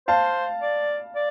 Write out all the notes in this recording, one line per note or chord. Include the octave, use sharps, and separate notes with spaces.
C5 F5 A5
D5
D5